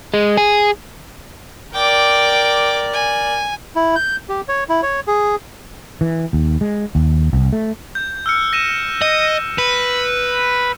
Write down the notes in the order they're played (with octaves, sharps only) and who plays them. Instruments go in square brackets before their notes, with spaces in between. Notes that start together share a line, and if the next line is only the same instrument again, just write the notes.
[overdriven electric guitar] G#3
G#4
[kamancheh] A#4 D5 [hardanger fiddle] G5 D6
[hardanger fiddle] G#5
[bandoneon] E4
G6
G4
C#5
E4
C#5
G#4
[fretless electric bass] E3
D#2
G#3
D#2
C2
A3
[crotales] G6
E6 F6 C#7
A#6 D#7 E7
[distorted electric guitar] D#5
B4